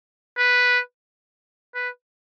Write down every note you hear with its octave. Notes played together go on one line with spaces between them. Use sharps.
B4
B4